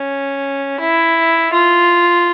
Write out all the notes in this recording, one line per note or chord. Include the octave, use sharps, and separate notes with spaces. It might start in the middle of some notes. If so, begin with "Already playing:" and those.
Already playing: C#4
E4
F4